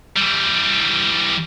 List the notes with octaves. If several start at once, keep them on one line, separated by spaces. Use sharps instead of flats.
E3 G3